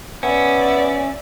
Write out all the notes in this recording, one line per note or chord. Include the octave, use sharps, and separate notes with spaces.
B3 C#4 D5 E5